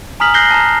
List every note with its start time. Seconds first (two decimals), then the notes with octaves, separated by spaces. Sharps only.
0.20 G#5 A#5 D#6 F6 B6 F#7
0.34 F#6 G6 A#6 C7 G7
0.51 A5 A#5